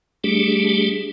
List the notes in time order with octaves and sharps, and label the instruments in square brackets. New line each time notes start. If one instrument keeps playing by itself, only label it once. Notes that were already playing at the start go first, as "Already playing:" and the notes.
[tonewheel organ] G3 A3 D4 G4 G#4